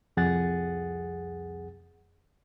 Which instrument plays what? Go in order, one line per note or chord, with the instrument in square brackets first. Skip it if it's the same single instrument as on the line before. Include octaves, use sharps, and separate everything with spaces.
[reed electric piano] C2 F2 G#4 F#5 A6